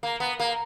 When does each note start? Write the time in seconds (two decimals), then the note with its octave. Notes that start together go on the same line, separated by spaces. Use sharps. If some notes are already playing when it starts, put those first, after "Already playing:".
0.03 A#3
0.20 B3
0.40 A#3